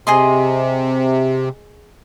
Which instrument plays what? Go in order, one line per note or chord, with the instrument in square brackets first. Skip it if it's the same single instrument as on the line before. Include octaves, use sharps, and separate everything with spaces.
[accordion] C3 [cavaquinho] G#4 D#5 C6